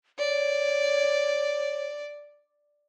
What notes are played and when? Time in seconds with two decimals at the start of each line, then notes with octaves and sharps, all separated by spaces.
0.19 C#5 D5